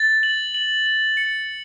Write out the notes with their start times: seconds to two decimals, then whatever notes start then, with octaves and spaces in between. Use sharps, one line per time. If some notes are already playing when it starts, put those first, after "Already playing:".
Already playing: A6
0.23 F#7
0.55 F#7
0.86 F#7
1.17 C#7